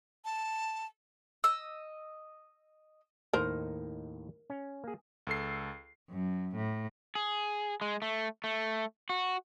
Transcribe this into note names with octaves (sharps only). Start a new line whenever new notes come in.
A5
D#5 E6
D#2 A2 D#4 A#4 C5
C#4
A#3 G#4
C#2 A4 C7
F#2
A2
G#4
G#3
A3
A3
F#4